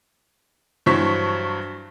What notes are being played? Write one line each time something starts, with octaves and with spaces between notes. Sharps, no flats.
G2 E3 F#3 C5 C#6 B6